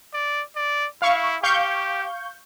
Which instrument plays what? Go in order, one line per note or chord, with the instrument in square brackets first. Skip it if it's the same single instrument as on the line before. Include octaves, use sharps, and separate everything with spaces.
[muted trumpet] D5
D5
[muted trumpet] E4 [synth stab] F5 C#6
[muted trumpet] G4 [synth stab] F5 C#6 G6